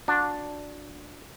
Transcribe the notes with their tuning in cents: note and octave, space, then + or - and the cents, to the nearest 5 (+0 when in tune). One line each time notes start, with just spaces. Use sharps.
D4 +0 F#4 -30